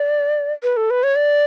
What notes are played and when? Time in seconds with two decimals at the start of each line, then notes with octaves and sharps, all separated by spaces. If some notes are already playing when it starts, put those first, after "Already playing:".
Already playing: D5
0.63 B4
0.77 A4
0.90 B4
1.03 C#5
1.16 D5